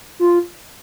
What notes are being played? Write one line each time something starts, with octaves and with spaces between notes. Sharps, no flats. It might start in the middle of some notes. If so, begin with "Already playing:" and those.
F4